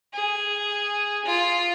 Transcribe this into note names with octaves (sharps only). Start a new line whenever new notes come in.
G#4
F4